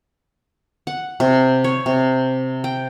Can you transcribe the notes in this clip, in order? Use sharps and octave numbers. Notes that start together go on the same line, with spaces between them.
F#5
C3
C#5
C3
G5